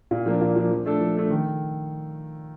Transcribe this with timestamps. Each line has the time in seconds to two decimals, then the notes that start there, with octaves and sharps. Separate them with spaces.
0.11 A#2
0.26 F3 A#3 D4
0.41 A#2
0.56 F3 A#3 D4
0.71 F3
0.86 A3 D4 A4
1.00 F3
1.16 A3 D4 A4
1.30 D#3